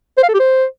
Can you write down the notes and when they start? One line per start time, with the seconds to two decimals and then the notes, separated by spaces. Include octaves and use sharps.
0.18 C5
0.23 F5
0.29 A4
0.34 G4
0.40 C5